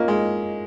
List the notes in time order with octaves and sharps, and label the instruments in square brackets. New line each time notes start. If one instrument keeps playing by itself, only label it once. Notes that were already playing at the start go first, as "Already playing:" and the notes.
Already playing: [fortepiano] A#3 C#4 [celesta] F4 D#5
[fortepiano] G#3